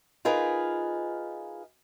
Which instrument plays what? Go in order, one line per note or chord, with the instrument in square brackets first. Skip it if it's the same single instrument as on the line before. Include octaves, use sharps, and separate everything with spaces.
[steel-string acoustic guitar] D#4 F4 G#4 A#4 B4